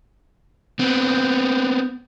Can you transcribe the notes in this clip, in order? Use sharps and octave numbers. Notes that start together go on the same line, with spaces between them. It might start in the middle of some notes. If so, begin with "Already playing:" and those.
B3 C4